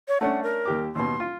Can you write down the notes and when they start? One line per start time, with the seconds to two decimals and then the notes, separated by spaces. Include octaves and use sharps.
0.08 C#5
0.21 A3 C#4 D4 F#5
0.43 A#4
0.65 D#2 G4 D6
0.95 D#2 B2 C6
1.20 F4